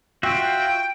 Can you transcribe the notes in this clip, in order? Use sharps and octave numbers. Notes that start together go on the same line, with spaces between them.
F4 F#4 E5 G5